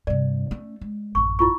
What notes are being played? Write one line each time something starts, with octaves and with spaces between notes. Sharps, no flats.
G2 C3 D5
A3 C#4
G#3
A1 F#2 C#6
E4 F4 C#6